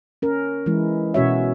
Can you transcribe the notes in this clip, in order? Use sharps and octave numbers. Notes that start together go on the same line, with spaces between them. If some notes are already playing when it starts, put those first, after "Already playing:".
C#4 A#4
E3 G#3 E4
B2 C#4 F#4 C#5 E5